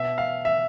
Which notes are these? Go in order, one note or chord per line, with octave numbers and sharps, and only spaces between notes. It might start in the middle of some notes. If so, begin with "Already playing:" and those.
Already playing: B2 E5
F5
E5